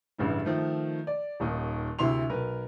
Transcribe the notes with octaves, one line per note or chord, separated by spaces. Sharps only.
A1 G2 C#3 E4
D#3 F3 A3
D5
D#1 D#2 D#4
D2 C3 E4 C6 F7
B1 A#4 B4